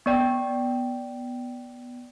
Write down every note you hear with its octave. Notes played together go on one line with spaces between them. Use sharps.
B3 D5 G5